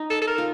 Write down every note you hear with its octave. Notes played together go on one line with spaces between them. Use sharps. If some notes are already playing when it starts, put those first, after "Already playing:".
Already playing: D#4
A4
A4
A#4
F4